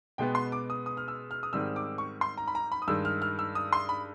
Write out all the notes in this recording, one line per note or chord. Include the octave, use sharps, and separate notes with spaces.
B2 G#3 B3 G5
C6
D6
D#6
D#6
F6
E6
F6
D#6
G#2 D#3 G3 C4 E6
D6
C#6
C6
A#5
B5
A#5
B5
D#6
G2 D#3 G#3 E6
F6
F6
E6
D#6
C6
B5